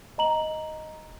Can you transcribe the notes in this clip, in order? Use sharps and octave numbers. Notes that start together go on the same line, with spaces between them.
D#5 A#5 F#7